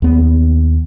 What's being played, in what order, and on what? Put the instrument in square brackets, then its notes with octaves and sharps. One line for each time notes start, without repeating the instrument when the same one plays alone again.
[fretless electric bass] D#2 B3